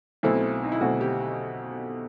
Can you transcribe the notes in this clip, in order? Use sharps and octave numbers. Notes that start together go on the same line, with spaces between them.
B1 B2 A3 C4 E4
D#4
E4
B1 B2 A3 C4 F#4
G4